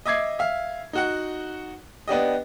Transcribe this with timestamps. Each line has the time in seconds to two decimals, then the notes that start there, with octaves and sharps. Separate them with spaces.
0.06 D#5 E5 D6 G#6 C7
0.39 E5 F5
0.93 D#4 F#4 F#5
2.08 B3 D4 G4 D#5